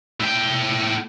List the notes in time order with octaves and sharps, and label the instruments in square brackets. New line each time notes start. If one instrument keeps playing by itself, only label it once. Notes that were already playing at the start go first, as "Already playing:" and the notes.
[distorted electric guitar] A2 G5